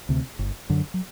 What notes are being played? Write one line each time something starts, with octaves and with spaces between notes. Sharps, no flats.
D2 C3
G1
F#2 D3
F#3